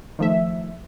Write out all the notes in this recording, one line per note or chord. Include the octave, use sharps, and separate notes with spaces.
D#3 F3 A3 E5